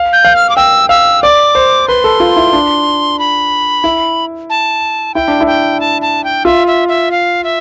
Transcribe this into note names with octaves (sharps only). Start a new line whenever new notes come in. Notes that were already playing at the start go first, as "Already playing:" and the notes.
Already playing: F5
G6
F5
F6
D6
G5 E6
F5 E6
D5 D6
C5
B4 C6
A4
F4
E4
D4
B5
E4
A5
E4 G5
D4
E4
G5
A5
A5
G5
F4 E5
E5
E5
F5
E5